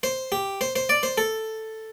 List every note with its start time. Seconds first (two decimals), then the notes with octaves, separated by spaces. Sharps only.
0.03 C5
0.32 G4
0.61 C5
0.76 C5
0.89 D5
1.03 C5
1.18 A4